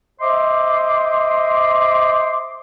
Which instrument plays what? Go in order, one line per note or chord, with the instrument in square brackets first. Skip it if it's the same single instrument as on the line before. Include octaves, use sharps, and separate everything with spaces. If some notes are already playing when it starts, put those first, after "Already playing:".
[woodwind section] C5 D#5 E5 C6 D6